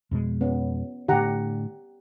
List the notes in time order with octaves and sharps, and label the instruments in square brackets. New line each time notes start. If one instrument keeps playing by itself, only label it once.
[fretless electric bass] F2 B2 G#3
[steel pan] B3 C#4
[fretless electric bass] A2 D3 [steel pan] G4 F#5 A#5